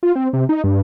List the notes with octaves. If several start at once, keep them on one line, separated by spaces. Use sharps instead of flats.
F4
C4
C3
D#4
G2